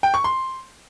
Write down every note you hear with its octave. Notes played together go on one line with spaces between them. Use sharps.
G5
C#6
C6